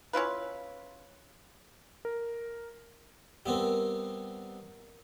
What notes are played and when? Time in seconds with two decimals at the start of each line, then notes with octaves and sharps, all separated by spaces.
0.13 C#4 E4 F4 B4
2.05 A#4
3.46 G3 B3 C4 A#4 E5